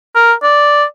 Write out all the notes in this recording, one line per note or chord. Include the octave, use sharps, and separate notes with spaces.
A#4
D5